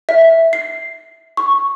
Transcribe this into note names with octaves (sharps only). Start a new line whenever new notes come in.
E5
C7
C#6